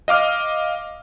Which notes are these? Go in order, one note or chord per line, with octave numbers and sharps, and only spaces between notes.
D#5 F5 D6 F6